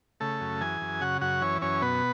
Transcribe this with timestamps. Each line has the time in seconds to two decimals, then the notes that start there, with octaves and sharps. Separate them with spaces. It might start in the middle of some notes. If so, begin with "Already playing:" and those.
0.20 C#3 A3 A4
0.41 F#2
0.61 E3 G#4 G#5
0.81 F#2
1.01 C#3 F#4 F#5
1.21 F#2 F#4 F#5
1.41 E3 C#4 C#5
1.61 F#2 C#4 C#5
1.82 B2 B3 B4